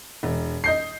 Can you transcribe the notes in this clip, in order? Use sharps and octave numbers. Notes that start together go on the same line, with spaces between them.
E1
D#5 G6 C7